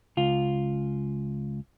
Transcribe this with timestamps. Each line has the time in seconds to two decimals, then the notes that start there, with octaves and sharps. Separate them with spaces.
0.17 C#2 F4